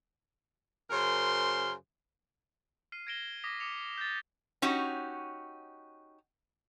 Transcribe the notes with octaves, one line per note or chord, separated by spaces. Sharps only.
F#2 C#3 A#4 C5 C6
F6 C7 D#7
G#6 A#6 D7 E7 G7
D6 D#6 A#6 B6
D6 D#6 C#7 F7
G6 A6
C#4 D#4 F#4 G4